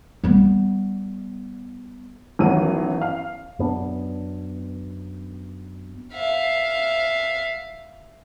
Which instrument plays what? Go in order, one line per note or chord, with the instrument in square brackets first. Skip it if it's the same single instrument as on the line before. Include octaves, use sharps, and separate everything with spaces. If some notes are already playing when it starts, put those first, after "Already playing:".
[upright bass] G3 B3
[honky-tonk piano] A1 E2 D#3 F#3 D#7
F5
[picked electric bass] F#2 B3 D4
[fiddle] E5 F5